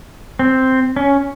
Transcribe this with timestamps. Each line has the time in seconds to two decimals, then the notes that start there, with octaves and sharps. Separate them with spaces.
0.39 C4
0.96 C#4